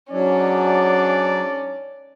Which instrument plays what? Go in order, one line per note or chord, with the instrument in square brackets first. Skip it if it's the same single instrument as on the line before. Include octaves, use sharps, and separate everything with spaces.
[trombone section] G#2 D4 [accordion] F#3 [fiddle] C#4 [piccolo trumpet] D5